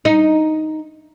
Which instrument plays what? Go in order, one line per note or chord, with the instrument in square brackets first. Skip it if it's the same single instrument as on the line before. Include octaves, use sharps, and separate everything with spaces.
[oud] D#4